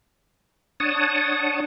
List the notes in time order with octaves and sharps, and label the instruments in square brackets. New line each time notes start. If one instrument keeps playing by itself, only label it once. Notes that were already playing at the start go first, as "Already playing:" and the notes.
[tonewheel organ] D4 C#5 F#5 A5 D#6